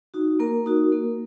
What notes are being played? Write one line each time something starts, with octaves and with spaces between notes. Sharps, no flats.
D#4 F#4
A#3 A#4
D#4 F#4
A#3